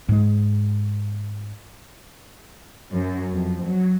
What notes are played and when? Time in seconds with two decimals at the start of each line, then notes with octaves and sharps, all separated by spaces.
0.09 G#2 G#3
2.90 F#2
3.32 F2
3.64 F#3